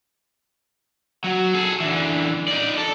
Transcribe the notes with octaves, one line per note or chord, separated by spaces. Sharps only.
F#3
G#4 A4
D3 E3
D#4 D5
A4